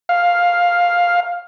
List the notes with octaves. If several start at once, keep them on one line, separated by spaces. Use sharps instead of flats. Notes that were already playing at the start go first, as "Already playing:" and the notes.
F5